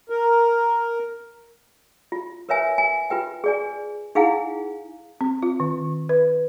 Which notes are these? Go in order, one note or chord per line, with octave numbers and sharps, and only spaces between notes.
A#4
F4
A#4 B4 C#5 E5 G#5
G#5
F4 B4 G5
G#4 D5 G#5
D#4 E4 G#4 F5 F#5 G#5
C4
F4
D#3
B4